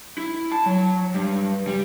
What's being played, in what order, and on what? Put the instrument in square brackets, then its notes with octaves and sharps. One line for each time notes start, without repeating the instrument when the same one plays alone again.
[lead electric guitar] E4
A5
F#3
G2
G3